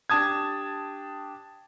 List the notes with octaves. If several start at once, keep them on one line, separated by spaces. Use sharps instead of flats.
D4 G4 A5 D#6 G#6